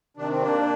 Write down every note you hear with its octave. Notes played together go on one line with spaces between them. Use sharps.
C3 D#3 D4
C4
A#3 D4